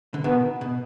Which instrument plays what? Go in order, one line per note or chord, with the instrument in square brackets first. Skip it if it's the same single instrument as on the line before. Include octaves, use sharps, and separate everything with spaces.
[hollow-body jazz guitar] D3
[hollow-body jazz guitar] B2 D#3 [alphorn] B3
[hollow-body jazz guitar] B2